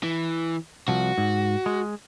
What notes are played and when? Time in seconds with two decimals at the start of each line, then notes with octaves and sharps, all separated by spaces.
0.03 E3
0.88 C2 F3 F#4
1.18 G#2
1.66 G#3